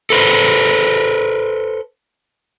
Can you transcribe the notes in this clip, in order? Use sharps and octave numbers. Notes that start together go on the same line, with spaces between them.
A4 B4 C5